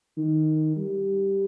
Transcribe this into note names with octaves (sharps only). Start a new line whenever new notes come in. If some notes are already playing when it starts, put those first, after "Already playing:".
D#3
G3